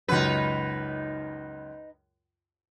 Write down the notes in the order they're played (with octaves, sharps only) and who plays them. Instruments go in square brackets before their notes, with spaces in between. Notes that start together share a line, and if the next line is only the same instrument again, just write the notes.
[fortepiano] C#2 F#2 [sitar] D#4 B4